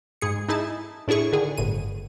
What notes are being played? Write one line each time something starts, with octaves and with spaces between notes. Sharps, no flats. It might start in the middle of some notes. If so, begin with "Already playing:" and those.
G#2 G#4 C#7
D#4 E4 G#4 A5
A2 D4 E4 G#4 C#6
D3 D#3 G#4
G1 A2 D#7